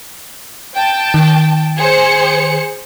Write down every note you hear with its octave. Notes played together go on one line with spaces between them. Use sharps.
G5 A5
D#3
G#4 C5 C#7